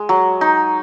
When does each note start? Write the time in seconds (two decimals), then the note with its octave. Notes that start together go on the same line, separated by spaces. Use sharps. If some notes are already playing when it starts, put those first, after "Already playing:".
Already playing: G#3
0.09 F#3
0.41 D#4